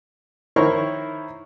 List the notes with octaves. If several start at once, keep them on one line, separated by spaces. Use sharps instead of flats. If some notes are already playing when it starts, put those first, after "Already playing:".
D#3 E4 A#4 C5 C#5 C#6